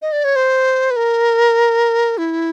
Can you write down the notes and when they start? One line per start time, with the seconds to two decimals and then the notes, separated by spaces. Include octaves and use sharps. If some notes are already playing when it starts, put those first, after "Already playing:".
0.02 D#5
0.12 D5
0.24 C#5
0.36 C5
0.91 B4
0.96 A#4
2.18 E4